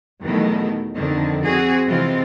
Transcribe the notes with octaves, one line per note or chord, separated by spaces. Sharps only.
E2 B2 D#3 F#3 A3
F2 D3 D#3
C4 F#4 G#4
C3 E3 G#3 C4 F4